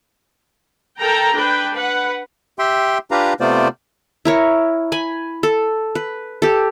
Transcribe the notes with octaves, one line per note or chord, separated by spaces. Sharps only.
A4 A#4 G5 A#5
D4 B4 G5
B4 F#5
G4 E5 G5 C6
D4 F4 G4 B4 F5 A#5
C3 A3 B3 F4 C5 D5
E4 A#4 C#5
G#5 B5
A4
B4
G4 A4